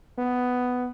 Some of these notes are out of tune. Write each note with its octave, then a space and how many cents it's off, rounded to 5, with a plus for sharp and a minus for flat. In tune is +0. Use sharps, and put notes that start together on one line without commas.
B3 +10